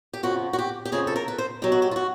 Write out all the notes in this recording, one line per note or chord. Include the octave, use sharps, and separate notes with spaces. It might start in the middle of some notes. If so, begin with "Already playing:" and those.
G4
F2 C#3 F3 F#4
F#4
G4
G4
F2 C#3 F3 G#4
A4
A#4
B4
C5
B2 F#3 G4
F#4
G4
F4
F#4